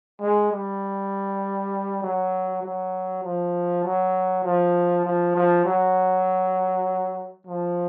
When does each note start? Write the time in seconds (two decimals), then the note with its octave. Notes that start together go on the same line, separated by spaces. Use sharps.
0.21 G#3
0.51 G3
2.02 F#3
2.63 F#3
3.23 F3
3.84 F#3
4.44 F3
5.04 F3
5.35 F3
5.65 F#3
7.47 F3